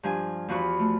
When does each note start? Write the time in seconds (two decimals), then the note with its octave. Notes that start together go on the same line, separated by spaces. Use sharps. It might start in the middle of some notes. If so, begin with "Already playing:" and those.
0.03 G2 F3 G#5
0.48 E2 F3 F#4 B5
0.79 A3